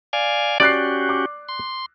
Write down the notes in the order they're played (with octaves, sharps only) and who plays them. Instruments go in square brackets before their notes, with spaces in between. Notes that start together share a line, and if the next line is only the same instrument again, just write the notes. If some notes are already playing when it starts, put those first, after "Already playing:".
[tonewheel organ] D5 F5 G#5
[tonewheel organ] C#4 F#4 G4 [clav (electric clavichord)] D5 [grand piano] D6 F#6 C7
[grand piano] D6
[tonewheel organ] C6